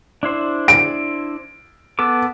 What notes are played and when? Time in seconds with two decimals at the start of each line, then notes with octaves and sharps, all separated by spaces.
0.23 D4 E4 C5
0.68 D7
1.99 B3 A4 D6